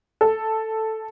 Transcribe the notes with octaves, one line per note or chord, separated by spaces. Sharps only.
A4